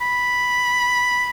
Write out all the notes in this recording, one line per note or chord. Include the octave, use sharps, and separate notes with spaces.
B5